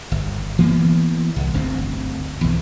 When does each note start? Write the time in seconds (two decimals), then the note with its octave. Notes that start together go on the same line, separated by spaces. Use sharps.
0.12 G1
0.58 E3 A#3 B3
1.36 C2
1.54 D1 G1 D2 C4
2.41 B1 E2